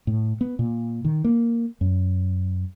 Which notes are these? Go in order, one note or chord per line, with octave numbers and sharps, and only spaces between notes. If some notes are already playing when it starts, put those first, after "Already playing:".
A2
B3
A#2
D#3
A#3
F#2